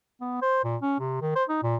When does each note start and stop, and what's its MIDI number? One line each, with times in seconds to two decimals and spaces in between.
0.21 0.38 59
0.42 0.64 72
0.64 0.76 46
0.82 0.95 61
0.99 1.17 48
1.21 1.31 51
1.36 1.44 72
1.49 1.61 63
1.63 1.76 46